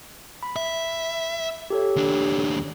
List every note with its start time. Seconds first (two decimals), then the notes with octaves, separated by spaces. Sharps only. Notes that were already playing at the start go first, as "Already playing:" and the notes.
0.43 B5
0.56 E5
1.70 G4 A4 C#5
1.96 D#2 D4